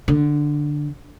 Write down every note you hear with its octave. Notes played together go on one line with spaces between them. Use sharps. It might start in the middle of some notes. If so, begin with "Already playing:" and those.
D3